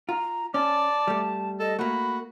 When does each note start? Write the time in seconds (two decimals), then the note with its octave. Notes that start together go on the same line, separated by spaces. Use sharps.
0.09 F4 A#5
0.54 C#4 D5 A5
1.07 G3 A3
1.60 A4 D#5
1.79 A3 A#3 F#4 B5